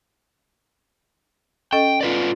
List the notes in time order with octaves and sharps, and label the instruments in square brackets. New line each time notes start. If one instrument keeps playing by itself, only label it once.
[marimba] C#4 A4 D#5 [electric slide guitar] G5
[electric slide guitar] F4 B4 D5